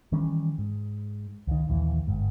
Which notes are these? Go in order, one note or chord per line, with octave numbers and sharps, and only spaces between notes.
D#3 E3 G3 C#4
G#2
C#2 D#3
A#1 D#2 E3
G1 G#2